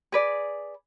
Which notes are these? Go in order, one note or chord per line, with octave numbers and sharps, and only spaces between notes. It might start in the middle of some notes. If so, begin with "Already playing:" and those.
G#4 B4 D5